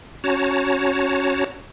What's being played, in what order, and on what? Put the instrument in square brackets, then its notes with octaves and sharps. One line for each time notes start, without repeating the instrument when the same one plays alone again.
[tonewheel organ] C#4 F#4 C#5 A5 A#5